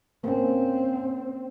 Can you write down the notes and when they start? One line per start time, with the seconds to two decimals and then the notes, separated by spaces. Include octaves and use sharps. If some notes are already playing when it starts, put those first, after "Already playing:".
0.24 A#3 C4 C#4